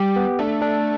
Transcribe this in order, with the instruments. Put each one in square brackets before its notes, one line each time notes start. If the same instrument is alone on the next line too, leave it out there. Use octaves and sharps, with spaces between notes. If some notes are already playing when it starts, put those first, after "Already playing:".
Already playing: [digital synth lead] G3 [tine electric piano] G4
[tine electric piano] B3
[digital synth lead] A3 [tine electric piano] D4
[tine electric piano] D4